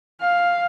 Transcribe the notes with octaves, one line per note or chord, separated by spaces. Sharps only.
F5